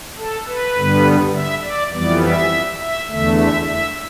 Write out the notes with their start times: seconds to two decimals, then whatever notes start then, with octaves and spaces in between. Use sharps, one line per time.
0.17 A4
0.46 B4
0.76 G2 D3 G3 B3
1.34 E5
1.63 D5
1.92 F2 E3 G3 B3 D5
2.21 E5
2.80 E5
3.08 E2 D3 A3 E5
3.37 E5
3.66 E5